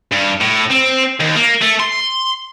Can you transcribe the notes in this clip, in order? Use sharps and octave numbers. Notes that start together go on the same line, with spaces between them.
G2
A2
C4
D#2
A#3
A3
C6